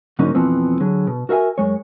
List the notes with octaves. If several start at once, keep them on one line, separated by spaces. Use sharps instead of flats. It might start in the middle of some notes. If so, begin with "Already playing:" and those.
G#2 D3 F#3 A#3 C#4 D#4
F2 B2 E3 F3 B3 C4
D3 F#3 G#4
B2
F#4 A#4 E5 F5 G#5
F#2 G#3 C#5